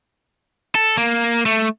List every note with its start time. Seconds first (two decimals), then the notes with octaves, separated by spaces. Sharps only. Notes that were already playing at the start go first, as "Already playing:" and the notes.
0.75 A4
0.97 A#3
1.46 A3